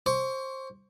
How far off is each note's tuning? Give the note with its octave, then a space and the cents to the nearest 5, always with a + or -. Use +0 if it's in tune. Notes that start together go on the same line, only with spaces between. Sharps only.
C5 +20 C#6 +30